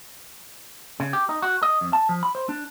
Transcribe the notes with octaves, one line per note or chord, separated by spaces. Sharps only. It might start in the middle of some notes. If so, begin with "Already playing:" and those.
C#3
G4
D#4
F#4
D#5
F2
A5
F3
B5
C5
D4